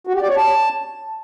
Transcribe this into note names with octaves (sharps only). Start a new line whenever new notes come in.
F#4
G4
D5
C#5
A5